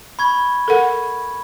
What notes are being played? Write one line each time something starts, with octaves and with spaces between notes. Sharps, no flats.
B5 C#6 G#6
A4 A#4 F#5